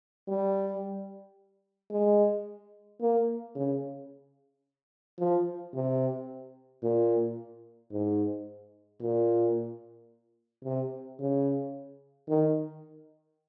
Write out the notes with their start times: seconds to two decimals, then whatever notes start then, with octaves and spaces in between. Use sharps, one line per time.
0.28 G3
1.91 G#3
3.01 A#3
3.56 C#3
5.19 F3
5.74 C3
6.83 A#2
7.92 G#2
9.01 A#2
10.65 C3
11.20 C#3
12.29 D#3